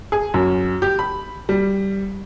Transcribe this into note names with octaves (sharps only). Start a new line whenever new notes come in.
G#4
F#2
G4
B5
G3